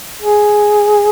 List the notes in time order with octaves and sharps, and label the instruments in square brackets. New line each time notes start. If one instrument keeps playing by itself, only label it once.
[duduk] G#4